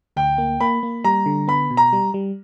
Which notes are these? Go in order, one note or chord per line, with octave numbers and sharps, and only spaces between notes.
D2 G5
A#3
A#3 B5
A#3
G3 A#5
D3
B3 B5
B2
A#5
G3
G3